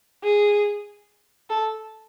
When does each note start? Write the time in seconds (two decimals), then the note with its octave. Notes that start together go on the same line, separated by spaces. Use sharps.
0.23 G#4
1.50 A4